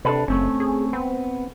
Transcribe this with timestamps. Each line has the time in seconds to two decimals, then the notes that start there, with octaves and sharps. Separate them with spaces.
0.05 C3 D4 A4 B4
0.28 F#1 A3 C4 C#4
0.60 G#4
0.93 B3 C4